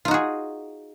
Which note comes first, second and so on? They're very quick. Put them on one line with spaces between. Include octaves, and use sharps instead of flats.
F4 D#4 F#4 G#4